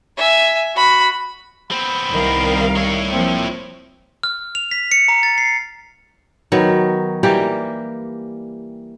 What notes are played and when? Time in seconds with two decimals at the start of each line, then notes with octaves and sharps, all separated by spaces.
0.17 E5 G#5
0.76 F#4 B5
1.71 B3 C4 B5
2.12 C2 D#3 A#4 F5
2.76 E4 C#5
3.12 F3 A#3 C4
4.23 F6
4.55 F7
4.71 B6
4.92 C#7
5.08 A#5
5.23 A6
5.38 C7
6.52 D#3 F#3 B3
7.23 E3 G3 A#3 G4